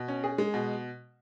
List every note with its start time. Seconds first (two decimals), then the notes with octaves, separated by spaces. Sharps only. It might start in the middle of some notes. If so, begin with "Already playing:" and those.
Already playing: B2
0.08 C#4
0.24 G#4
0.38 G#3
0.54 B2